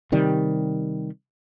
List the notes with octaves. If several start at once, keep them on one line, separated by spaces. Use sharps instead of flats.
C3 D#3 G3